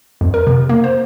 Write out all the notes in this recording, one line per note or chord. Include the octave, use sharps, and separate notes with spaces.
F2
A#4
C3
A#3
C5